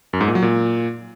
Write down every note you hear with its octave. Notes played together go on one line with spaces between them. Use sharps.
F#2
G#2
A#2
F#3
A#2